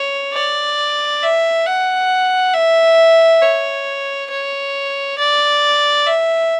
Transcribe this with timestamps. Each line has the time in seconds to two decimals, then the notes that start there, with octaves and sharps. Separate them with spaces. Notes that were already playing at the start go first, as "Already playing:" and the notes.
Already playing: C#5
0.34 D5
1.22 E5
1.66 F#5
2.54 E5
3.42 C#5
4.30 C#5
5.18 D5
6.07 E5